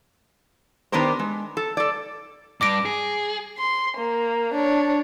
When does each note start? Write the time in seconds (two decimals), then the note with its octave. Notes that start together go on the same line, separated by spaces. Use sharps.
0.92 D#3 B3 D4 G4 A#4 C5
1.19 G#3
1.57 A4
1.77 A4 D5
2.61 G2 D6 A#6 D7
2.86 G#4
3.58 C6
3.97 A#3
4.54 D4 C#5